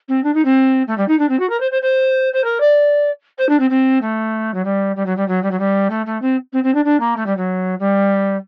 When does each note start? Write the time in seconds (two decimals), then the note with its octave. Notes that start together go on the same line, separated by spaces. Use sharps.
0.08 C4
0.23 D4
0.34 D#4
0.45 C4
0.87 A3
0.97 G3
1.08 D#4
1.19 D4
1.29 C4
1.39 F#4
1.49 A#4
1.60 C5
1.71 C5
1.82 C5
2.33 C5
2.44 A#4
2.60 D5
3.38 C5
3.49 D4
3.59 C4
3.70 C4
4.01 A3
4.54 F#3
4.64 G3
4.96 G3
5.06 F#3
5.17 G3
5.28 F#3
5.43 G3
5.51 F#3
5.59 G3
5.90 A3
6.06 A3
6.22 C4
6.53 C4
6.63 C4
6.74 D4
6.85 D4
7.00 A#3
7.16 A3
7.26 G3
7.37 F#3
7.79 G3